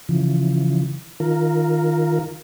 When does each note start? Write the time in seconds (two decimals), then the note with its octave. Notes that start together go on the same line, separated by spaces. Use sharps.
0.09 C#3 E3 F3
1.20 D#3 F4 A#4